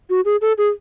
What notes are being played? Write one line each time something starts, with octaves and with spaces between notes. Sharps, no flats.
F#4
G#4
A4
G#4